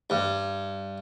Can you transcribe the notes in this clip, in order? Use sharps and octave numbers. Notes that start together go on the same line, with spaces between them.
G2